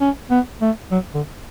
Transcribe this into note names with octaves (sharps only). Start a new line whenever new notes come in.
C#4
B3
A3
F#3
D3